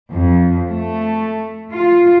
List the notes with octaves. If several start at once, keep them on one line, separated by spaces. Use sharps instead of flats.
F2
A3
F4